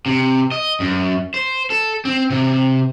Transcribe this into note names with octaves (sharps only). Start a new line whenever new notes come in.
C3
D#5
F#2
C5
A4
C4
C3